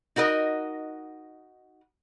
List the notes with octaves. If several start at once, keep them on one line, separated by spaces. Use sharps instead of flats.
D#4 F#4 A#4 D#5